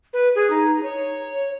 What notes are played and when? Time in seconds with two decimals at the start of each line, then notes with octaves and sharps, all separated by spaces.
0.13 B4
0.35 G#4
0.50 D#4
0.83 C#5